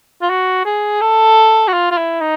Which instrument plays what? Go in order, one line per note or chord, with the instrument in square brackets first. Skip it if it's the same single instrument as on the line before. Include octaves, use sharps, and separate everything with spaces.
[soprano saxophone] F4
F#4
G#4
A4
F#4
F4
F4
E4
D#4